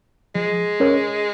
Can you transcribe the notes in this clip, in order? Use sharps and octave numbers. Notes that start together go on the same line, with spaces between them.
F3 G#3
C#4 A#4 C#5